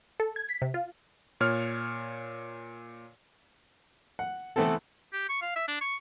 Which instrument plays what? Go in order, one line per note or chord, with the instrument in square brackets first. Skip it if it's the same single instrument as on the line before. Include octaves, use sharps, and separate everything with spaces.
[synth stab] A4
G#6
B6
C3
F4
[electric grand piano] A#2 C#5 F6
[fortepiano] F#5
E3 A3 B3 C4 E4 A4
[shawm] G4
C#6
F5
E5
D4
C#6